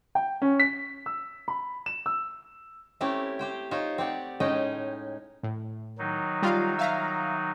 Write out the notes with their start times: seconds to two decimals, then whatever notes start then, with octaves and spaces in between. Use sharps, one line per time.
0.15 G5
0.42 C#4
0.60 B6
1.06 E6
1.48 B5
1.86 E7
2.06 E6
3.01 A3 C4 C#4 E4 G4
3.39 G4 C5 G5
3.71 D#4 F4 C5 C#5
3.98 C4 G4 D5 F#5
4.40 A2 G#3 C#4 D#4 D#5 G5
5.43 A2
5.99 D#3 F#3 D#4
6.42 G3 F4 F5
6.78 E5 F5 A#5